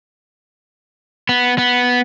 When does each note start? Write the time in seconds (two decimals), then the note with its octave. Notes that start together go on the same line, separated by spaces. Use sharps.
1.29 B3
1.58 B3